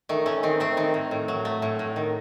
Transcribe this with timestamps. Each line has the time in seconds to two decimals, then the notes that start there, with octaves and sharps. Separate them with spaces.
0.09 D#3 A3
0.26 A3 C#4
0.43 D#3 C4
0.60 A3 C4
0.77 D#3 C4
0.94 A2
1.11 A2
1.28 F#3
1.45 A3
1.62 A2
1.79 A2
1.96 D#3